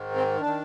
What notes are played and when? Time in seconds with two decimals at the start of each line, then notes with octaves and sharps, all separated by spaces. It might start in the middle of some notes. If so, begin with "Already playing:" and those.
Already playing: G#2 D#3
0.15 C4
0.40 D4
0.45 D#3